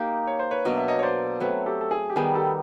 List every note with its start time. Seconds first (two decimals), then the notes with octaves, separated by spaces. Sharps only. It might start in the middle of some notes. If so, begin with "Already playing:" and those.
Already playing: A#3 D#4 G4
0.27 C#5
0.39 C5
0.51 B4 C#5
0.65 B2 F#3 A#3 D4 D#5
0.77 E5
0.88 C#5 D#5
0.99 C#5
1.03 C5 D5
1.40 F#3 A3 C4 B4 C#5
1.66 G4 A4
1.81 A4
1.91 G#4
2.10 G4
2.16 D#3 G3 B3 D#4 G#4
2.35 G4 A4